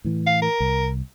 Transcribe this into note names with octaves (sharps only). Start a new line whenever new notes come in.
A2 E3
F5
A#4
C2